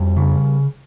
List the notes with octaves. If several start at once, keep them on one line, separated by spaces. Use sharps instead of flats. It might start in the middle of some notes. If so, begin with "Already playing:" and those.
Already playing: F2 G3
C#3